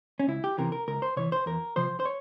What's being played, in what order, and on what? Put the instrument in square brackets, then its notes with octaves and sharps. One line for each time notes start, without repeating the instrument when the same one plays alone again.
[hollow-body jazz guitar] C#4
C#2 E4
G4
C3 E3 A#4
A#4
C#2 A#4
C5
C3 E3 C#5
C5
E2 A#4
C3 F3 C5
C5
C#5